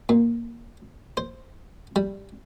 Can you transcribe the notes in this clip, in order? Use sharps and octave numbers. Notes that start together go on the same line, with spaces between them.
A#2
C5
G3